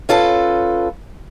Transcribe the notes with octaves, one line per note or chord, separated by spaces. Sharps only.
C#4 F4 A4 B4